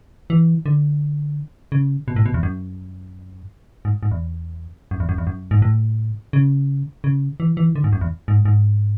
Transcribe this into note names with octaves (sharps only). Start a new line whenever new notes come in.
E3
D3
C#3
B2
A2
B2
E2
F#2
G#2
G#2
E2
F#2
E2
F#2
E2
F#2
G#2
A2
C#3
C#3
E3
E3
D3
G#2
F#2
E2
G#2
G#2